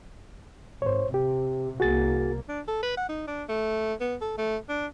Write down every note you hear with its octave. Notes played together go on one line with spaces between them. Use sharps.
G#1 C5 C#5
C3 G4
C2 A#3 F#4 G#4 A6
D4
A4
B4
F#5
D#4
D4
A3
B3
A4
A3
D4